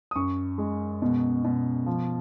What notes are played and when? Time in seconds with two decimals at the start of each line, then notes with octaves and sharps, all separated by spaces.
0.11 D#6
0.15 F#2 C#6
0.58 G#3
1.02 B2
1.44 B2
1.86 F3